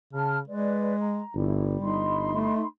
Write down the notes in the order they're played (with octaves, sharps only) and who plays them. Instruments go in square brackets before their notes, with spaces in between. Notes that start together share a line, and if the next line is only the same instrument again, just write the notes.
[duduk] C#3 [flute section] A5 F6
[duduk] G#3 [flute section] B4 D5
[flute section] A#5
[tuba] G1 [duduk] G3 [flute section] E4
[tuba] G1 [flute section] D#4 B5 C6
[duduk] A3